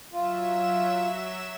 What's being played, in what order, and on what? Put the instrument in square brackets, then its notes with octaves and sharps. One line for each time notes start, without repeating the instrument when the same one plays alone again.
[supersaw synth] F#3 E5 E7 [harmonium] F4